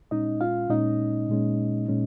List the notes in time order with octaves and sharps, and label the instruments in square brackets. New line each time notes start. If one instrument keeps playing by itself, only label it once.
[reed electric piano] A#2 G#3 C#4 D#4 D#5
F4 F5
A#2 G#3 C#4 D#4 D#5
A#2 G#3 C#4
A#2 G#3 C#4